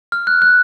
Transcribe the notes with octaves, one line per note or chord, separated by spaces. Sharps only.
F6
F#6
F#6